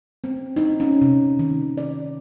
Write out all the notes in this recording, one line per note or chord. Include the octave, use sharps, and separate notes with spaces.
C4
D#4
C#4
C3
D#3
D5